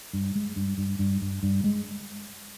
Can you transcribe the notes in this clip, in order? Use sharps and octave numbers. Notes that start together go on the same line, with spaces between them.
G2
G#3
G2
G2
G2
G2
G2
G#3